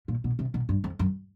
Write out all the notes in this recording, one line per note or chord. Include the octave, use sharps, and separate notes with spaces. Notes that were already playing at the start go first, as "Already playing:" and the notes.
A#2
B2
C3
B2
G2
F2
F#2